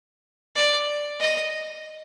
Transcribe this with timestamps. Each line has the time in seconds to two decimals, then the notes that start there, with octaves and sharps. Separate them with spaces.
0.56 D5
1.20 D#5